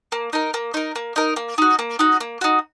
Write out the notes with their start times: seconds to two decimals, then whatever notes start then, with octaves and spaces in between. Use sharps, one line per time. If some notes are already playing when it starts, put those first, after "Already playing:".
0.12 A#3
0.33 D#4 A#4
0.54 A#3
0.74 D#4 A#4
0.96 A#3
1.16 D#4 A#4
1.36 A#3
1.58 D#4 F#4
1.79 A#3
1.99 D#4 F#4
2.20 A#3
2.41 D#4 F#4